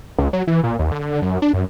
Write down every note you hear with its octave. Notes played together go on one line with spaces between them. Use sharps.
C#2
F#3
E3
A#2
D#2
D3
F#2
D4
F#2